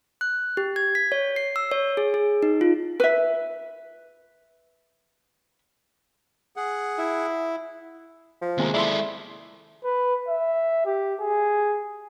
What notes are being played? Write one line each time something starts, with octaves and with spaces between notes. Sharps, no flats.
F#6
G4
G#6
B6
C#5
C7
E6
C#5
G#4
G#4
D#4
F4
B4 E5
G#4 F#5
E4
F3
D#2 C3 G#3 A#3
G#3 E4 A4 D5 E5 C6
B4
E5
G4
G#4